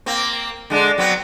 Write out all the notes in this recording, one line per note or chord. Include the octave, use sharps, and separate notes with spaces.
A#3 C4
D3 G#3 D4
F#3 B3 C4